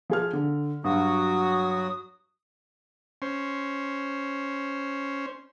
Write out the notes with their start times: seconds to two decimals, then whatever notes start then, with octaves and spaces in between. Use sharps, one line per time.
0.10 F3 G#4 F6
0.33 D3
0.84 G2 F#3 F#4 D#6
3.22 C#4 C5